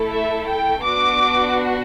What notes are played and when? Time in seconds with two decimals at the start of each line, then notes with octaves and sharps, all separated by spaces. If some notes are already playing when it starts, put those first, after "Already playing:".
Already playing: A3 E4 A4
0.10 E5
0.47 G5
0.83 B3 D4 F#4 D6